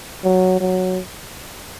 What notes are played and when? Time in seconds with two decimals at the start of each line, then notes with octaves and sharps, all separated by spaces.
0.24 F#3
0.60 F#3